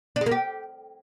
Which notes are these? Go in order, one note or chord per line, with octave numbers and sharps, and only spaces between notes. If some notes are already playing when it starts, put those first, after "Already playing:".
D4
G#3
A#3
G4